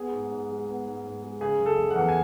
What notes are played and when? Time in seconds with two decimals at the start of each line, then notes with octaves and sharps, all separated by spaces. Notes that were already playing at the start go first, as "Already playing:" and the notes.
Already playing: B3 G#4
0.12 G#2
0.31 G#2
0.49 G#3
0.67 B3
0.86 G#2
1.04 G#2
1.23 G#3
1.41 C#3 G#4
1.59 F#1
1.66 A4
1.77 F#1
1.91 F#5
1.96 E2
2.09 G#5